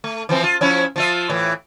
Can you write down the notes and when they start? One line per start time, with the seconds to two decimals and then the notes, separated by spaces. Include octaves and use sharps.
0.04 A3
0.29 E3 F3 C4
0.44 F4
0.61 F3 C#4 E4
0.96 F3 F4 E5
1.29 A2 E3